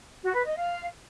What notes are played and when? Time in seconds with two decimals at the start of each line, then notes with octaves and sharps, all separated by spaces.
0.23 F#4
0.34 B4
0.45 D#5
0.57 F5